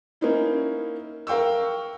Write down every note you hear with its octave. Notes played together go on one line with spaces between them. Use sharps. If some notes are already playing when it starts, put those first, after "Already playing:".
A#3 C#4 D#4 E4
A#4 F5 G5 C#6 E6